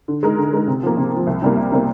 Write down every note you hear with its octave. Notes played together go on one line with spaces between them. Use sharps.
D3
G#3 D#4 A#4
D3
G#3 D#4 A#4
C3
F3 A#3
C3
F3 A#3
C2
C3 G3 A#3
C2
C3 G3 A#3